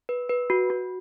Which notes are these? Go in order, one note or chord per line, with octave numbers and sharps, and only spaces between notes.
B4
B4
F#4
F#4